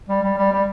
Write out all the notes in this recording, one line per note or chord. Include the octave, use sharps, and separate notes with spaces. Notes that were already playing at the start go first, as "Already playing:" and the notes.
G3
G3
G3
G3